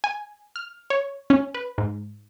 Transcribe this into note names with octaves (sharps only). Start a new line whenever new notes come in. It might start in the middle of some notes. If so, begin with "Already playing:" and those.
G#5
F6
C#5
C#4
B4
G#2